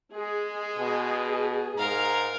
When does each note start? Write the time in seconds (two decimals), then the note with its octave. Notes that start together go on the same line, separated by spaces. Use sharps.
0.14 G#3 G#4
0.78 B2
1.78 G#2 A#4 F5 A#5